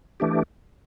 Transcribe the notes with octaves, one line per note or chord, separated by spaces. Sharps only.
E3 A3 D4 G4